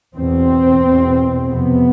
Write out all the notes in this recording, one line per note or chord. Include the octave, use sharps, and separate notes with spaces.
E2 B2 C4
E2 B2
F2 C3 B3